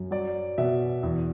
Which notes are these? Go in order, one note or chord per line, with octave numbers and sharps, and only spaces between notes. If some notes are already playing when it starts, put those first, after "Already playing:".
Already playing: F#2
F#3 D5
B2 E5
E2